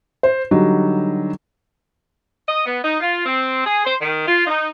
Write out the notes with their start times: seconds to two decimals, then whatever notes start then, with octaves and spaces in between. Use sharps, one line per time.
0.23 C5
0.51 D3 F#3 G3 D#4
2.47 D#5
2.65 B3
2.83 D#4
3.00 F4
3.26 C4
3.65 G#4
3.85 C5
4.01 D#3
4.27 F4
4.47 D#4